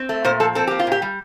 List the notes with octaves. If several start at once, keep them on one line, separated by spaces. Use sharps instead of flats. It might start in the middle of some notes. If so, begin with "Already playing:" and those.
Already playing: C4
A3
A#2 C5
F3 A4
C4 A4
A#3 G4
F4
A#2 G4
G3